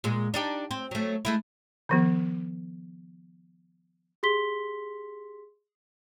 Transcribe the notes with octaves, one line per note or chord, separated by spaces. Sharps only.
A#2 G#3
D4 D#4 G4
C4
F#3 A3
G#3 A3 E4
D#3 F3 B3
G4 G#4 C6 B6 G7